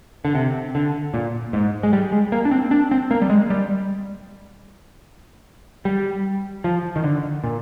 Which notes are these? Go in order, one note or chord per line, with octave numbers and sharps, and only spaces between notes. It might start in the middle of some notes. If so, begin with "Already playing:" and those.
D3
C3
D3
A#2
G#2
G#3
G3
G#3
A#3
D4
C4
D4
C4
A#3
G3
G#3
G3
G3
F3
D#3
D3
A#2